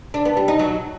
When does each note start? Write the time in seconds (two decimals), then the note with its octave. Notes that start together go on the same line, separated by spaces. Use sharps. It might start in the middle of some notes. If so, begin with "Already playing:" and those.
0.14 D4
0.25 B3
0.37 G3
0.48 D#4
0.59 F#3